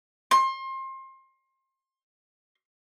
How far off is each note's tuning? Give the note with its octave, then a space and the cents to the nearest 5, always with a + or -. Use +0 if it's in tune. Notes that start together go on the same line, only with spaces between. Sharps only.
C6 +30